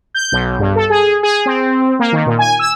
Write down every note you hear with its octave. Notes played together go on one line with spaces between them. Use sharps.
G6
B1
G2
A4
G#4
G#4
C4
A#3
D#3
A#2
G#5
E6